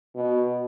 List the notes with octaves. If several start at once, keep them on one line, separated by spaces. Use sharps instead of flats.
B2